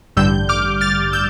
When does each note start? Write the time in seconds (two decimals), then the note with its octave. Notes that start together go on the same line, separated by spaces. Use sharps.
0.17 A1 G2 D3 G3 E6 G6
0.49 D6 F6
0.81 F6 A6
1.13 E6 G6